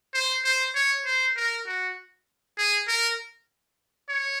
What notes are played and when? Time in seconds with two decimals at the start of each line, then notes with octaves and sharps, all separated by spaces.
0.14 C5
0.44 C5
0.75 C#5
1.06 C5
1.36 A#4
1.67 F#4
2.58 G#4
2.88 A#4
4.09 C#5